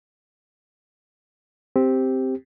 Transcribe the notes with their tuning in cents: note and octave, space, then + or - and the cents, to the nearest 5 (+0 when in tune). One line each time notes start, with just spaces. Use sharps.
C4 +0 G4 +0